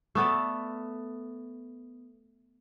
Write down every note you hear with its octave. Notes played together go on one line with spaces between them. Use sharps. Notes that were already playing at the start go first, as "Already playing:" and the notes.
A3 B3 A4 D5